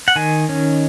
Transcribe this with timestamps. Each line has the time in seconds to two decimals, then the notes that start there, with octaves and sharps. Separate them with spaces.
0.08 F#5
0.16 D#3 G#5
0.49 C#4